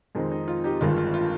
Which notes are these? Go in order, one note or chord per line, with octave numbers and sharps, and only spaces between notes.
F2 D#3 G#3 C4 D#4
D#4
F4
D#4 G4
G1 G2 D#3 G#3 F4
F4
F4